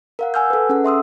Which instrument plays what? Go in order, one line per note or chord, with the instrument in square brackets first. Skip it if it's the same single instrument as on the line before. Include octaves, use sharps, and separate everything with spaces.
[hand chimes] A#4 F5 F#5
F#5 G#5 E6 F6 G6
A4 B4
C#4 G#4 A4 F#5
E5 C6 D#6 E6